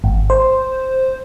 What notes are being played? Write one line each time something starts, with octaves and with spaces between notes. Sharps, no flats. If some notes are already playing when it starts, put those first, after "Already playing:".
G#1
C5